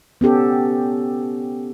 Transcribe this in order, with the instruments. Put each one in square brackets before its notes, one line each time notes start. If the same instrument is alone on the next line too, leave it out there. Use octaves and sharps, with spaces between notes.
[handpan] B3 C#4 G4 A4